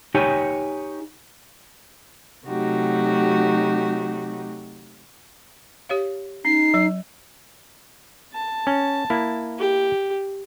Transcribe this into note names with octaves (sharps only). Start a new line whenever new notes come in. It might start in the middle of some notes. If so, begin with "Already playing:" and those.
D#4 G4 C#5 G#5
C3 F#3 A3 D#4 F#4 G4
G4 C#5 F5
C#4 D#4 C7
F#3 D5
A5
C#4
A#3 E4
G4